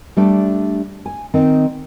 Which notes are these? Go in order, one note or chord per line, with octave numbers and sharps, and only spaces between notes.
G3 A3 D4 D5
G#5
D#3 C4 D#4